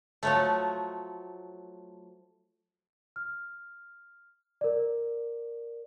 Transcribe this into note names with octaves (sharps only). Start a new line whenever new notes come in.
F3 F#3 A3
F6
A#4 D5